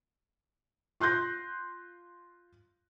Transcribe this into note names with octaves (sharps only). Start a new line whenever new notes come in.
F4 C6 F#6 G6 A#6